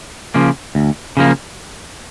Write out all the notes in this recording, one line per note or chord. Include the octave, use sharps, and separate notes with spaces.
C#3 F3 A#3
D2
C#3 F3 A#3